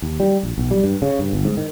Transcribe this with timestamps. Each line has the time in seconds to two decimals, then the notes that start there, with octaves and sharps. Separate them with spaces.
0.02 D#2
0.20 G3
0.43 A#1
0.58 B1
0.71 G3
0.84 G2
1.02 C#3
1.19 G2
1.33 G1
1.45 G#2
1.57 D#3